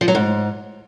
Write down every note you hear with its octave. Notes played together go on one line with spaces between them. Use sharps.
F3
F#3
G#2